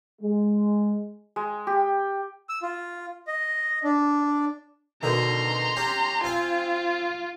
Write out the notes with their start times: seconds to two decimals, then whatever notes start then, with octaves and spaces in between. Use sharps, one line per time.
0.22 G#3
1.36 G#3
1.67 G4
2.49 E6
2.62 F4
3.27 D#5
3.84 D4
5.03 B2 D3 D#3 A#5 C6
5.76 C#4 G4
6.24 C4 F4 G#5